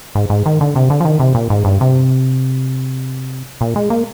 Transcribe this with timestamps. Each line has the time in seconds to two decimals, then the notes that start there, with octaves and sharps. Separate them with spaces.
0.15 G#2
0.30 G#2
0.46 D#3
0.61 D3
0.76 C3
0.90 D3
1.00 F3
1.05 D#3
1.20 C3
1.35 A#2
1.50 G#2
1.65 G2
1.81 C3
3.61 A#2
3.76 G#3
3.90 A#3